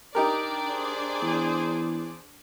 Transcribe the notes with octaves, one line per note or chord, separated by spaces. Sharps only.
D4 D#4 G4 A#4 D5
G#4 C5
E2